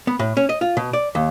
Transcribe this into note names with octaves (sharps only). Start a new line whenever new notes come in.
B3
A2
C#4
D#5
F4
B2
D5
D#2